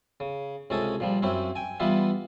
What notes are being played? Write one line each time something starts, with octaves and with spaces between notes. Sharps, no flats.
C#3
C#2 C3 C#4 A4 G#5 D#6
A#2 F3 G3
F#2 C4 C#4 E4
G5 G#5
E3 G3 B3 E4 F4